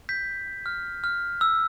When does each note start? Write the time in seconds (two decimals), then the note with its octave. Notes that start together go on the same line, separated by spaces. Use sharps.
0.09 G6 B6
0.66 F6
1.04 F6
1.41 E6